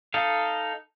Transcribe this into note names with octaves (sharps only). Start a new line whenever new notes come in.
D#4 A4 F5